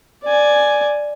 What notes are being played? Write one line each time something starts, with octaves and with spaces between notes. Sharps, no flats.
D5 G#5